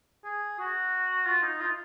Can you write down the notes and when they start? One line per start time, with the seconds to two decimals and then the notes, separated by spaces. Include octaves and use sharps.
0.24 G#4
0.59 F#4
1.26 F4
1.42 D#4
1.60 F4